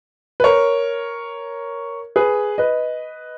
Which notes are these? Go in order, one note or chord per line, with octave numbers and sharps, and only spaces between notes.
B4
A#4 C#5
G#4 B4
B4 D#5